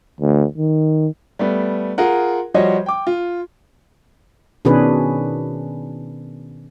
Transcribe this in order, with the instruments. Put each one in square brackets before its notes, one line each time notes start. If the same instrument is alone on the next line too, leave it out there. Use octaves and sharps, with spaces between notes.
[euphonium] D2
D#3
[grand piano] G3 A3 B3
F4 G#4 A#4 F#5
F3 G3 F#4 C5 C#5 D#5
G5 D6
F4
[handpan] B2 D#3 C#4 D4 G#4 B4